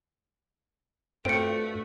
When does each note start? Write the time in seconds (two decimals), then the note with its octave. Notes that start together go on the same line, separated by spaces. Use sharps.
1.25 G2 A3 C4 F4 F#4 C5 C#7 D7